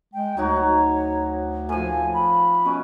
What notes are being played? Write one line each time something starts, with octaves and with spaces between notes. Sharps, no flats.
G#3 G5
D2 F#3 D#4 F#4 C#5
A#5
A2 F3 G#5
B5
B2 C#4